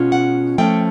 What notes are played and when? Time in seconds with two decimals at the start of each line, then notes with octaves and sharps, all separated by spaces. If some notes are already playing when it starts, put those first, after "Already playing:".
Already playing: B2 G#3 C#4 F4
0.12 F#5
0.58 F3 A3 C#4 G5